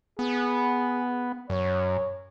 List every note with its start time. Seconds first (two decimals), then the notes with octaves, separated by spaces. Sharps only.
0.19 B3 G#4
1.50 F#2 C#5